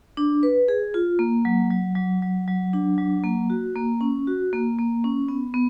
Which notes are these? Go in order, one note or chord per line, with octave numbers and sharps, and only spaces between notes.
D4
B4
G#4
F4
A#3
F#3
F#3
F#3
F#3
F#3
D4
F#3
A#3
F#4
A#3
C#4
F#4
A#3
A#3
C#4
B3
B3